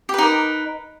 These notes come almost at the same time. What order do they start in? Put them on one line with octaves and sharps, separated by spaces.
G4 B4 D#4 A#4